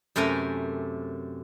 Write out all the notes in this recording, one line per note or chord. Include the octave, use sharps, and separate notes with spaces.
F#2 C3 A3 A#4 G#5 A#5